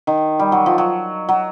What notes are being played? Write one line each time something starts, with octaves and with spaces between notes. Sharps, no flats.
D#3
G3
F#3
F3
F#3
F#3